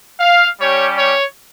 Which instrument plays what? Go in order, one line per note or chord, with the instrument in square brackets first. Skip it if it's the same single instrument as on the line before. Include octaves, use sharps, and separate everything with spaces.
[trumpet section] F5
G3 C#4 G4 C#5
C#5